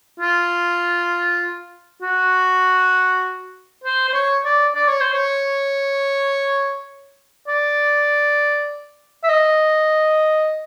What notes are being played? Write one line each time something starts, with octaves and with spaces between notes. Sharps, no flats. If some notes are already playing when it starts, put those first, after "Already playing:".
F4
F#4
C5
C5
C#5
D5
D5
C#5
C5
C#5
D5
E5
D#5